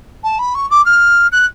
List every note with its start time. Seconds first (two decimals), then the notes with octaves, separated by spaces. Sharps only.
0.24 A5
0.39 B5
0.55 C#6
0.70 D6
0.85 F6
1.32 F#6